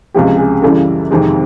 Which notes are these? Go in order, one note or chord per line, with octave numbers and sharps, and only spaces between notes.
C#2 C3 F3 G#3 G4
G#4
F#2 C#3 E3 G3 A4
F2 C3 D#3 G#3